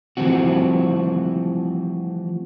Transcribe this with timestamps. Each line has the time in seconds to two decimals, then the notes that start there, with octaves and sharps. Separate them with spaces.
0.17 E3 F3 G3 A3 C4 F#4